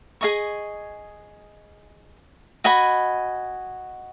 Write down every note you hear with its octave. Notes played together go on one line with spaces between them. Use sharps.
G#4 D#5 G#5 C#6
F#4 D#5 G#5 B5